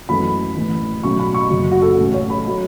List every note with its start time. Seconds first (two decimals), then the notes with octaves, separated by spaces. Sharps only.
0.09 F#2 E3 A3 C#4 B5
0.57 A1 A2 E3
1.03 B1 A2 F#3 A3 C#4 C#6
1.20 B5
1.34 C#6
1.50 F#1 F#2 C#3
1.72 F#4
1.82 A4
1.98 A1 A2 A3 C#4
2.14 C#5
2.30 B5
2.46 A2 F#3 A3